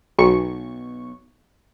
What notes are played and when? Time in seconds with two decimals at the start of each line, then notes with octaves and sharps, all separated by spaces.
0.19 B1 C#6